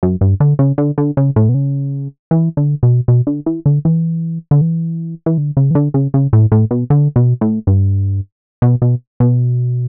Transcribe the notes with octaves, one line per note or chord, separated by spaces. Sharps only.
F#2
G2
D3
C#3
D3
D3
C#3
A2
B2
C#3
E3
D3
B2
B2
D3
E3
D3
E3
D3
E3
E3
D3
C#3
E3
D3
C#3
C#3
A2
A2
B2
D3
B2
A2
G2
B2
B2
B2